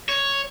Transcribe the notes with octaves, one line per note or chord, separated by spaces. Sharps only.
C#5